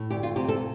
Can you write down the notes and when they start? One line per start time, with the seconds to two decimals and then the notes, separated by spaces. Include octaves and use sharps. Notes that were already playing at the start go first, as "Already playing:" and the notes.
Already playing: A2
0.10 D2 G4
0.23 F4
0.36 C3 G4
0.49 A4